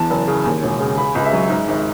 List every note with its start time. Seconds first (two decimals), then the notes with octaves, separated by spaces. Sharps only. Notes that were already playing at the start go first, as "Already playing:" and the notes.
Already playing: E2 A5
0.10 F#1
0.27 C#3
0.45 D#2
0.63 E1
0.80 C#3
0.97 C#3 B5
1.15 C#2
1.24 E5
1.33 F#3
1.50 G#2
1.68 G#1